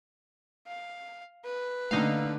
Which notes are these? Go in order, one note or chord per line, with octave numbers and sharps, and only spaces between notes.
F5
B4
D3 A3 A#3 C#4 D#4 F5